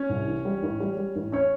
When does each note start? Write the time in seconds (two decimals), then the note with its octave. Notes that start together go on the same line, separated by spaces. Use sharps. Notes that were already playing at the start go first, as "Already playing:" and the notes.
Already playing: C#4 C#5
0.10 C2
0.27 E3
0.45 G3
0.63 A1
0.80 G3
0.97 G3
1.16 A1
1.32 C#4 C#5